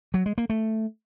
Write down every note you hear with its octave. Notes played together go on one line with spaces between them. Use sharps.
F#3
G#3
A#3
A3